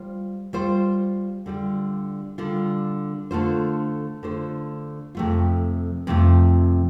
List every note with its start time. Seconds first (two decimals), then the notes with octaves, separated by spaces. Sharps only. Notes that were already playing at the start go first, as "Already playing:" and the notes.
Already playing: G3 F4 C5
0.53 G3 F4 C5
1.46 D3 G3 F4
2.38 D3 G3 F4
3.31 D3 A3 F4 C5
4.23 D3 A3 F4 C5
5.15 F2 C3 A3 F4
6.07 F2 C3 A3 F4